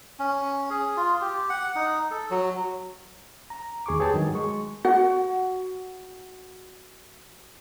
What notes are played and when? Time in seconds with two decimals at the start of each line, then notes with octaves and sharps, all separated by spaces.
0.19 C#4
0.70 G#4
0.97 F4
1.21 G4
1.50 F#5
1.76 D#4
2.11 A4
2.30 F#3
3.50 A#5
3.86 D#2 G#4 C#6 D6
4.00 G4 G#4 B4 C#5 G5 A5
4.14 G2 D#3 F#3
4.35 G#3 C#6
4.85 F#4 F#5